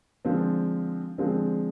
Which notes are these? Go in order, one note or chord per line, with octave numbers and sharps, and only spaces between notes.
D3 F3 G#3 C4
D3 F3 G#3 C4